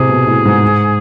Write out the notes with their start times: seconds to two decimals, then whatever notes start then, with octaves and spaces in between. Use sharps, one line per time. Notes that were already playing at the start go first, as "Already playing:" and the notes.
Already playing: A2 C3 G#4
0.09 B2
0.27 A2
0.45 G#2
0.63 G#2